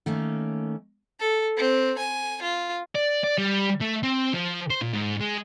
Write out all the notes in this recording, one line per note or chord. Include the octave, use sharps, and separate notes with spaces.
D#3 A3 A#3 C#4
A4
C4
G#5
F4
D5
D5
G3
A3
C4
F3
C5
A#2
G#2
G#3